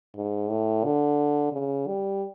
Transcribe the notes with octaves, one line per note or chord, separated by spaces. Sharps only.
G#2
A2
D3
C#3
G3